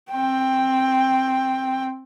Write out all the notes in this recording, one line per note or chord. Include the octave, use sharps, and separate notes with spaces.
C4 G5